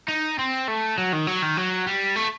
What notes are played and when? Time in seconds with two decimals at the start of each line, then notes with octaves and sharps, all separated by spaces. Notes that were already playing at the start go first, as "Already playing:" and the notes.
0.09 D#4
0.39 C4
0.68 A3
0.98 F#3
1.13 D#3
1.27 F#3
1.42 D#3
1.57 F#3
1.86 G3
2.16 A3